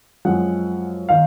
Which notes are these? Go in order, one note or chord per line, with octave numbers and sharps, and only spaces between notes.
F#2 F3 G#3 C4 F#5
D#3 F5